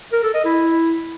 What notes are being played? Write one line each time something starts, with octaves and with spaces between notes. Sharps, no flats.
A#4
A4
D#5
E4